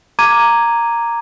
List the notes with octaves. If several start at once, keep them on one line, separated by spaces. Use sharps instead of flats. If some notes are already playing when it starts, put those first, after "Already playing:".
A#5 D6 G#6 D#7